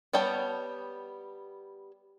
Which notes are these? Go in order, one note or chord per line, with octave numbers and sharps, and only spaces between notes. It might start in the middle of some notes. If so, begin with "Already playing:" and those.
G3 B3 C#5 G5 A5